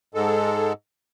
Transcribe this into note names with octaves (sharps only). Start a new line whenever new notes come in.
G#2 G#3 A4